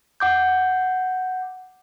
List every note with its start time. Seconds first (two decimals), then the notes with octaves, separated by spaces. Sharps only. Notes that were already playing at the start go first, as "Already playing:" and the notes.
0.20 F#5 D6 G6